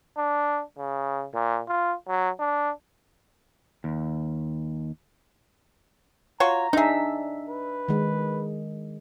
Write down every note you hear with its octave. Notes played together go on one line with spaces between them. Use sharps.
D4
C#3
A#2
F4
F#3
D4
D#2
F4 F#4 C#5 A#5
D4 D#4 G#4 E5
B4
D#3 G#3